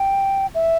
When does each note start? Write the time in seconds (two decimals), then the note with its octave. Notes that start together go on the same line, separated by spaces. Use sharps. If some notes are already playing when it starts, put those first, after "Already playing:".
Already playing: G5
0.55 E5